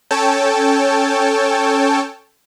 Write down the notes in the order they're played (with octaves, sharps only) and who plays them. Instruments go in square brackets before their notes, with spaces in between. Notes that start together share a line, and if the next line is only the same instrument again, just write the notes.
[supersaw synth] C#4 A4 C#5 G5 A5